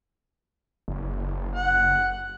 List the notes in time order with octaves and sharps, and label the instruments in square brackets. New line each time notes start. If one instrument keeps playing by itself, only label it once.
[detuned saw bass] F#1
[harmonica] F#5